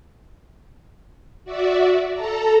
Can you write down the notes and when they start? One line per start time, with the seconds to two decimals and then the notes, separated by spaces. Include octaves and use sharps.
1.45 F#4 D5 E5
2.13 A4 A5 A#5